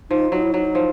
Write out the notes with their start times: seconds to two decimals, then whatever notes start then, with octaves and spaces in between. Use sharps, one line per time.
0.10 F3 D#4
0.32 F#3 D#4
0.42 E4
0.52 F#3 D#4
0.75 F3